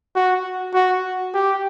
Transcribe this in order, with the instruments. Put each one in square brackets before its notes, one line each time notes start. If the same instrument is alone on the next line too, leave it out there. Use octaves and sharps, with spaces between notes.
[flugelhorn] F#4
F#4
G4